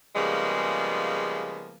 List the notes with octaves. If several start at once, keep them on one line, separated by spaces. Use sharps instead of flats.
C#3 F3 G3 G#3 A#3 B3